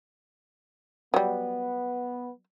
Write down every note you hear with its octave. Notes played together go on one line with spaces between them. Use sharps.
F#3 G3 B3